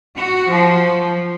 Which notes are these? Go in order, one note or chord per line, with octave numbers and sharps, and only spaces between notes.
F#4
F3